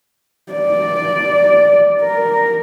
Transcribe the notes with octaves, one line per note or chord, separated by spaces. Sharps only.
D5
A#4